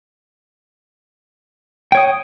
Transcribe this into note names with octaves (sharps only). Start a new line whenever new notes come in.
C#5 G5 D#6